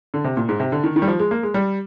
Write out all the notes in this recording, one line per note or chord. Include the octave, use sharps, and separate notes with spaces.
D3
C3
A#2
G#2
C3
D3
D#3
D#3
G3
F3
G#3
A#3
G#3
G3